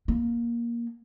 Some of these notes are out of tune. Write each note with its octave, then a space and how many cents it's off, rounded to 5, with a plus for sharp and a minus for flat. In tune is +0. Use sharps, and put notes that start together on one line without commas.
A#3 +15